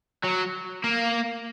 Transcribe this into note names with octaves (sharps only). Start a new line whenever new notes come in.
F#3
A#3